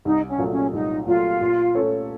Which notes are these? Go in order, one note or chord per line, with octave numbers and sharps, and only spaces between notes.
C2 D#4
C#4
A#2 F#3 A3
C#4
C2 D#4
A#2 F#3 A3 F4
A#2
A3 C#4 A4 C#5